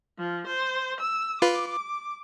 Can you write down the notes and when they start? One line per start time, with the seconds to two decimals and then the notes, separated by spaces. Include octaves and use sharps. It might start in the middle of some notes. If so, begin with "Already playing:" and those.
0.18 F3
0.47 C5
1.00 E6
1.42 F4 B4 D6